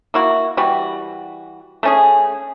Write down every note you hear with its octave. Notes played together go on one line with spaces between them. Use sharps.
A#3 E4 F#4
E3 G3 F#4
A3 C#4 G#4